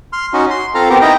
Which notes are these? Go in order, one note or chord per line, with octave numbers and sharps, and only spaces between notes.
C6 F6
C#4 D#4 F#4
C6
C4 F4 A4 F5 A#5
B3 C4 G4 A#4
D#4 E4 D#5 G5 A#5